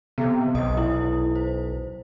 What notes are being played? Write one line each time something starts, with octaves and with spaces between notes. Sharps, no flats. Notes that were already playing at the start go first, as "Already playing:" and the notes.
C3 B3
B1 D#5 D#6
E4
C5